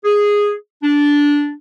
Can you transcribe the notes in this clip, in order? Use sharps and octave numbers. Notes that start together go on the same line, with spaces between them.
G#4
D4